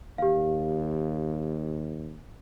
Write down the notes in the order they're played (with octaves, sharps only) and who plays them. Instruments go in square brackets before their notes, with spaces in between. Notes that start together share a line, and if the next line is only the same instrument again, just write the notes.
[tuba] D#2 [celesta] G4 F5